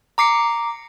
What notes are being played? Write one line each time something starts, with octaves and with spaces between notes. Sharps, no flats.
A#5 D6 C7 C#7